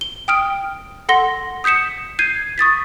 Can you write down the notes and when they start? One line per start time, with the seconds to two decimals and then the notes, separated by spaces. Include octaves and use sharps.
0.01 G7
0.28 G5 D#6 F6 D7
1.09 A4 F#5 C6 A#6 G7
1.64 D#6 G6 B6 C#7 E7
2.19 G6 G#6 C7 D#7
2.58 C#6 D#6 A6 B6